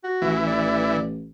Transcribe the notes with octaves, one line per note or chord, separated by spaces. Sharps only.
F#4
A1 E3
D5